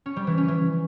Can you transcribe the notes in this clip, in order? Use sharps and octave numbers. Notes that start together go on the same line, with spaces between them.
C#4
G3
E3
C#4
E3